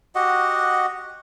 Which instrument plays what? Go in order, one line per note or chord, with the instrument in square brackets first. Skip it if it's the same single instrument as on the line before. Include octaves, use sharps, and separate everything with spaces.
[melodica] F#4 G4 D#5 F#5